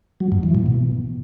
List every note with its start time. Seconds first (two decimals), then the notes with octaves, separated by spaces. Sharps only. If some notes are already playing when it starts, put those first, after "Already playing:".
0.20 F#3
0.32 G2
0.43 E3
0.55 A#2
0.66 B2